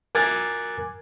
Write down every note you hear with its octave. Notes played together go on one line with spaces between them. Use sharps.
A#4 G#5 D6 F#6 G#6 A6